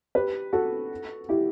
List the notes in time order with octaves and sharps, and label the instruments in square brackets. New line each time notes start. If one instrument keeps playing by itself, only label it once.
[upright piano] G4 B4
F#4 A4
E4 G4